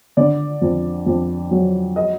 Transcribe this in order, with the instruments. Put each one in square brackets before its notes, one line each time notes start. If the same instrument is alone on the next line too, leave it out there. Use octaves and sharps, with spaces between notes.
[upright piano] D3 D5
F2
F2
F#3
D#5